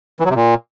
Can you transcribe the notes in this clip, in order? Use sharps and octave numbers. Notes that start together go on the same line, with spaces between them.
E3
F#3
C3
A#2